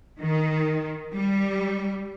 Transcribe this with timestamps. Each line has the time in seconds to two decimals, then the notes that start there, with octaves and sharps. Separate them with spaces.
0.20 D#3
1.13 G3